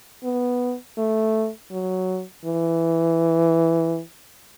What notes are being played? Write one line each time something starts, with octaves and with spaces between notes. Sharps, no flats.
B3
A3
F#3
E3